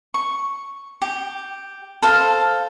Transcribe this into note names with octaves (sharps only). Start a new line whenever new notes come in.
C#6
G4
A4 C5 F5